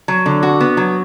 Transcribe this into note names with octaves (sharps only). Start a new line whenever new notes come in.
F#3
D3
F#4
B3
F#3